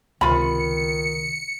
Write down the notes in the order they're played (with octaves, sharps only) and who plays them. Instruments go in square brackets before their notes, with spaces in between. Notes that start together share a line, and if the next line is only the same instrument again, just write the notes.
[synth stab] C#2 C3 [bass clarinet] D#3 [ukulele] F4 B5 [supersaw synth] C#7